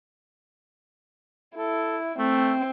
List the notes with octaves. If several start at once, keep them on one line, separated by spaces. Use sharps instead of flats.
E4 A4
A3 C4